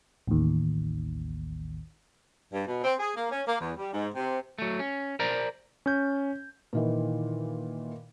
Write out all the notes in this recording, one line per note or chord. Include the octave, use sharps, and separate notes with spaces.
A1 D#2
G2
B2
C4
G#4
A#3
C#4
A#3
E2
G3
G#2
C3
F#3 A3
C#4
A#4 C5 D5 A#5
C#4 G6
A#2 D#3 E3